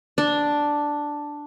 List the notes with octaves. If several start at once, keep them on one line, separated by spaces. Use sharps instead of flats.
D4